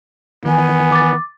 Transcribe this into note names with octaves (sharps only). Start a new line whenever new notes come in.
D#3 E3 B3 G#5
D6 A6